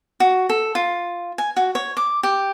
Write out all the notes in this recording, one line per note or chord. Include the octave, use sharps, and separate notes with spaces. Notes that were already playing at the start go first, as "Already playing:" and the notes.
F#4
A4
F4
G#5
F#4
C#5
D6
G4